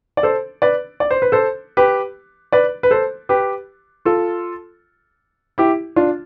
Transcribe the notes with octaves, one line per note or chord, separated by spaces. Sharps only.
D5
A4 C5
B4 D5
D5
C5
B4
A4 C5
G4 B4
B4 D5
B4
A4 C5
G4 B4
F4 A4
E4 G4
D4 F4